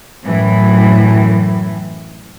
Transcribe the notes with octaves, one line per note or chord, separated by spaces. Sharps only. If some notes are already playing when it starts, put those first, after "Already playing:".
F#2 A2 E3